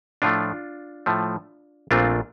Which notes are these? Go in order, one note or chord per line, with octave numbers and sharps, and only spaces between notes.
A2 F3 A3 D4 F4
A2 F3 A3
A#1 A#2 A3 C4 D4 F4